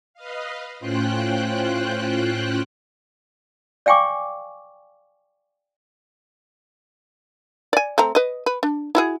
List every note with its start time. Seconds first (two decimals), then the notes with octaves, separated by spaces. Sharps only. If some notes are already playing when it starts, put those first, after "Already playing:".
0.14 B4 D#5 F5
0.79 A2 C#4 F4 C5 G5 F#6
3.86 D5 F5 G5 G#5 C#6 D6
7.73 D5 G#5
7.98 A3 C4 A#5
8.15 B4 D#5
8.46 B4
8.63 D4
8.95 E4 F#4 G#4